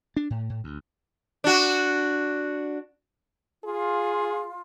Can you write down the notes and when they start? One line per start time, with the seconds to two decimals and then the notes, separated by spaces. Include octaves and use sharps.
0.16 D4
0.30 A2
0.50 A2
0.64 D2
1.44 D4 F#4
3.64 F4 G#4